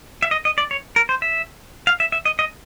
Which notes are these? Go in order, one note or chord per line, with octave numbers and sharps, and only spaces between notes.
E5
D#5
D#5
D5
C#5
A#4
C5
E5
F5
E5
E5
D#5
D#5